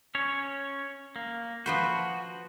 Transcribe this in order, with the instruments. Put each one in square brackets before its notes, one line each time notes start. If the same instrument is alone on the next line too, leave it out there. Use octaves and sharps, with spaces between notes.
[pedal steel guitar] C#4 C#5
A#3
[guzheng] F3 B4 C5 [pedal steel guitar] F#4